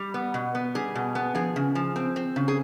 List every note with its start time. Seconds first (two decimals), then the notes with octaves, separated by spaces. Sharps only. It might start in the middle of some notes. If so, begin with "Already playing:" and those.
Already playing: G3
0.14 B3
0.34 B2
0.55 B3
0.75 G3 G#4
0.95 B2
1.15 B3
1.35 F3 G#4
1.56 C#3
1.75 F3
1.96 C4
2.16 C4
2.36 C#3
2.48 G#4